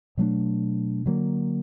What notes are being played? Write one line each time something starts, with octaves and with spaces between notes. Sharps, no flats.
B2 F#3 A3 D4
D3 F#3 A#3